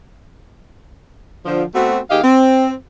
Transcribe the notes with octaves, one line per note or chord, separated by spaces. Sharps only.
D3 F3
A3 B3 C4 F#4
D#2 D#3 G4 G#4 D#5 F5
C4